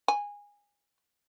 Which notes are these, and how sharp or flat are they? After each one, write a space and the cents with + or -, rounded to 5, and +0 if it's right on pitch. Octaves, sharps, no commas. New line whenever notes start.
G#5 -20